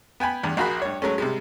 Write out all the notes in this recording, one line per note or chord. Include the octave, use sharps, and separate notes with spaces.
B3 G5 G#5 B5
E2 G2
A#1 A#3 F#4 G#4 B5 F#6
G2 C#5
F#3 G#3 A3 C#4
C3 G3 G#3